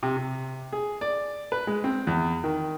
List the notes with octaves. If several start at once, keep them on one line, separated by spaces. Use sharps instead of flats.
C3
C3
G#4
D5
B4
G#3
C4
E2
D#3